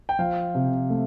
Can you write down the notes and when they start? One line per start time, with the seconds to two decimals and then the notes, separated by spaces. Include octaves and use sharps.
0.09 G5
0.19 F3 F5
0.55 C3
0.90 A3